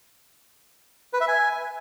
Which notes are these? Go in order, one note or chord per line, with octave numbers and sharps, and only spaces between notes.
B4
E5
G#5